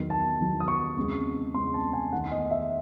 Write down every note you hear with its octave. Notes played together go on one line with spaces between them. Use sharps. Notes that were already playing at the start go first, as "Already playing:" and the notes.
Already playing: E2 D#3 F#3
A5
E2 D#3 F#3
D#6
C#6
E2 C#3 G#3 C4
E2 C#3 G#3 C4 C6
A5
G#5
E2 D#3 A3 F#5
D#5
E5